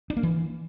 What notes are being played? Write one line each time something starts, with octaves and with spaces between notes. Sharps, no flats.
D4
A#3
E3